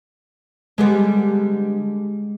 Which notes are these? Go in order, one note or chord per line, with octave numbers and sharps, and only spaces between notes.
D3 G3 G#3 B3